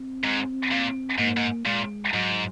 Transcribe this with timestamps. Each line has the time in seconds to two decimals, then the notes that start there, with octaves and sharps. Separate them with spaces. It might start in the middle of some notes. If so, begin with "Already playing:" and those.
Already playing: C4
0.24 G#2
0.72 A#2
1.18 G#2 A#3
1.37 G#2
1.66 A#2 G#3
2.13 G#2 F#3